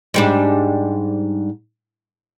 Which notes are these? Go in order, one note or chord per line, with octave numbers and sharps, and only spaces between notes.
G#2 G3 D4